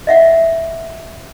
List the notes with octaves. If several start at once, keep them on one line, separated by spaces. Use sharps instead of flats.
D#5 E5 F#5